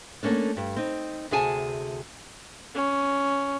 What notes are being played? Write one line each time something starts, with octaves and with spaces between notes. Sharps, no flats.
A3 A#3 C#4 D4
G2
C4 D#4
D2 C3 G#4 G#5 A5
C#4